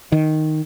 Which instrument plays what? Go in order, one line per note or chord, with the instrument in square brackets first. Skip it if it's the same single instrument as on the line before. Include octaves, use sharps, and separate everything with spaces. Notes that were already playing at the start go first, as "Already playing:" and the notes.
[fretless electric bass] D#3